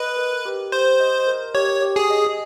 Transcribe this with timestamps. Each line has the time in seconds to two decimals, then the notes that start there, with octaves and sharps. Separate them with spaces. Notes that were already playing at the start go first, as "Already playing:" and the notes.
Already playing: B4 D#5
0.17 A#4
0.45 G4
0.72 G4 C5
1.00 D#5
1.27 A#4
1.55 G4 C#5
1.82 G4
1.96 G#4
2.10 D#5